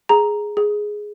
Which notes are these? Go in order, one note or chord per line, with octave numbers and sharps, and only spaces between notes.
G#4 A#5
G#4